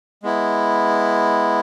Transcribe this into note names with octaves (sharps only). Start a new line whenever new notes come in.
G#3 B3 E4